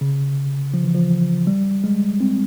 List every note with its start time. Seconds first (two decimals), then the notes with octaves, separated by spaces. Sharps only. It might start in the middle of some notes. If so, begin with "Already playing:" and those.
0.01 C#3
0.74 F3
0.84 E3
0.94 F3
1.47 G3
1.84 G#3
2.20 C4